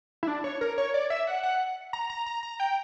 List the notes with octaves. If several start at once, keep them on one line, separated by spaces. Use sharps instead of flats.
E4
D4
C#5
A#4
C#5
D5
E5
F#5
F#5
A#5
A#5
A#5
A#5
G5